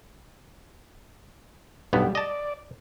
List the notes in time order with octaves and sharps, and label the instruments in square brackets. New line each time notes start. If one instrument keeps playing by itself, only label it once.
[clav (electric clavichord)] B1 G2 B3 [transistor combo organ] G3
[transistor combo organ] D5 [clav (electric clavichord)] D#5 A5